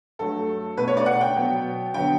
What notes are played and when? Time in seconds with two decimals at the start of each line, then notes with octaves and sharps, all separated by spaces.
0.19 G2 F#3 A3 A4
0.77 B2 A3 B4
0.88 C#5
0.97 D5
1.06 F#5
1.21 G5
1.36 B2 F#3 B3
1.94 D3 F#3 B3 G5